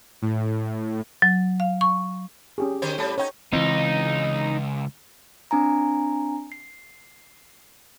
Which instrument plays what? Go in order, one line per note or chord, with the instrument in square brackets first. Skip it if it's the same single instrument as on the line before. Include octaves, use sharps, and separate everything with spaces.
[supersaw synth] A2
[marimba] F#3
F5
C#6
[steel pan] C#4 G4 G#4
[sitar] D3 C5 C#5
[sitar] A2 G3 [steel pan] A4 A5
[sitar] C#4 D#4 [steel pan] C#5 G5
[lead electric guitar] C#2 [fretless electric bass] E3 C4 [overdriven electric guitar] D#4
[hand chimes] C4 D4 G#5 A#5
C7